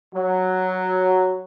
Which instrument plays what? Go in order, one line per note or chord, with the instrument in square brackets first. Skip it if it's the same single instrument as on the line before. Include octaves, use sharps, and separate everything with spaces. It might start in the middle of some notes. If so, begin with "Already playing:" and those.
[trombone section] F#3